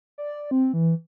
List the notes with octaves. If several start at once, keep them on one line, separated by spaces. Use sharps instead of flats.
D5
C4
E3